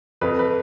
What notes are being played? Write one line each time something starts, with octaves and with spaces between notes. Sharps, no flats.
F2 B4
B4